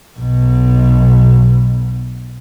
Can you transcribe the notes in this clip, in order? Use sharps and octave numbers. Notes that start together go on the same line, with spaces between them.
B1 B2